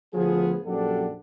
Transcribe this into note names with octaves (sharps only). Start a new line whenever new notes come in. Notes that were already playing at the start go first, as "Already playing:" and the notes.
D2 F3 B3 G#4
A#1 F#2 D4 G4 A4 F#5